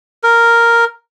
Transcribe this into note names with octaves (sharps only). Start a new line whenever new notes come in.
A#4